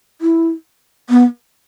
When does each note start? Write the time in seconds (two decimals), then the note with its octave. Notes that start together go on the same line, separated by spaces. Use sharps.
0.21 E4
1.10 B3